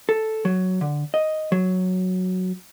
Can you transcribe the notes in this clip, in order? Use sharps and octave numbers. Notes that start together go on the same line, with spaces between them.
A4
F#3
D3
D#5
F#3